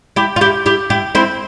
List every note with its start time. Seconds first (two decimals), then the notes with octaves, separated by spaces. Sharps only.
0.16 E4 G4
0.36 F4
0.41 E4 G4
0.66 E4 G4
0.90 E4 G4
1.15 C4 E4